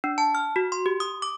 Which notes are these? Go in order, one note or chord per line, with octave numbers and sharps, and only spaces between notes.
D4
A5
F6
F#4
C6
G4
D#6
D6